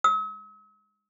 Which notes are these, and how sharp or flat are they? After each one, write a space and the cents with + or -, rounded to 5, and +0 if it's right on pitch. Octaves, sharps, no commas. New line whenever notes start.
E6 -45